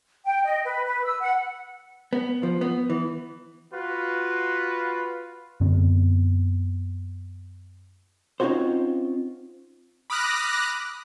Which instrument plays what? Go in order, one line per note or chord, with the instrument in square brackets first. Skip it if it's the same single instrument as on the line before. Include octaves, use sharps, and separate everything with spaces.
[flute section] G5
D#5
B4
B4
E6
F#5
[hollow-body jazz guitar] B3
F3
B3
E3
[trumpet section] F4 F#4 B4
[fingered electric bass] F#2 D3 B3 C4
[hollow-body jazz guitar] C4 C#4 D#4 F4 F#4 C5
[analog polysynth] B5 D6 D#6 F6 F#6 A#6